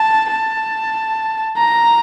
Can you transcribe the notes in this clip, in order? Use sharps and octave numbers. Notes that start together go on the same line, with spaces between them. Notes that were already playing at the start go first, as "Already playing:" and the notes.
Already playing: A5
A5
A#5